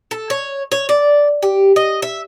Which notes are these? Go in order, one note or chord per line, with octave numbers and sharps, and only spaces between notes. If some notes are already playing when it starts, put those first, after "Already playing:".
A4
C#5
C#5
D5
G4
D#5
E5